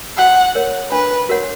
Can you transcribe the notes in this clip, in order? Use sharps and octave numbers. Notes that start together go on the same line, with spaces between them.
F#4 F#5
A#4 C#5
D4 B4
F#4 A#4 C#5 F#5